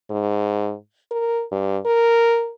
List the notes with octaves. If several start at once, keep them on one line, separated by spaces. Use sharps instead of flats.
G#2
A#4
G2
A#4